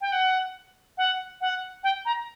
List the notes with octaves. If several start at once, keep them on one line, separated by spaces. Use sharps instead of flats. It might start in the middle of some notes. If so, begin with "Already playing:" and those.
G5
F#5
F#5
F#5
G5
A#5